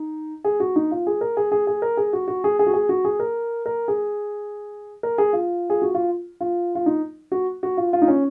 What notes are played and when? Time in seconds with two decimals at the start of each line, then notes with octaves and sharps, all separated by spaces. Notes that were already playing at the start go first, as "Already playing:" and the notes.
Already playing: D#4
0.44 G#4
0.60 F#4
0.76 D#4
0.91 F4
1.07 G#4
1.21 A#4
1.37 G#4
1.52 G#4
1.67 G#4
1.82 A#4
1.97 G#4
2.13 F#4
2.28 F#4
2.44 G#4
2.59 G#4
2.67 F#4
2.73 G#4
2.89 F#4
3.05 G#4
3.20 A#4
3.66 A#4
3.88 G#4
5.03 A#4
5.18 G#4
5.33 F4
5.70 G#4
5.82 F#4
5.95 F4
6.41 F4
6.75 F4
6.86 D#4
7.32 F#4
7.63 F#4
7.77 F4
7.93 F4
8.02 D#4
8.08 C#4